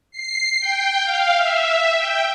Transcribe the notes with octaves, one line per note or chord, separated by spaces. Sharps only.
C7
G5
F5
E5
G5